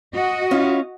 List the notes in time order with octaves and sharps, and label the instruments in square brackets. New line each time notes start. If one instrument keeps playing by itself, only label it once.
[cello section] F#4 D#5
[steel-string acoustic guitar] C#4 E4 F4